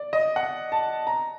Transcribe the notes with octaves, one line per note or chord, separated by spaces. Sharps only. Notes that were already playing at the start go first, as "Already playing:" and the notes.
Already playing: D5
D#5
F#5
A5
A#5